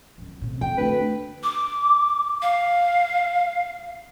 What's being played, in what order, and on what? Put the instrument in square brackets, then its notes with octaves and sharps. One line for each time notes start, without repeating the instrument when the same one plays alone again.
[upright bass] D1 C#2
A2 C3
[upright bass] C4 D#4 [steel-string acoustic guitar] G5
[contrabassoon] D2 [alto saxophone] B4
[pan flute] D6
F5